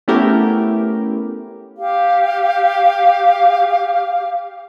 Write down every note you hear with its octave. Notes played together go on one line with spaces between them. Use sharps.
A3 B3 C#4 E4 G4 A#4
G4 F5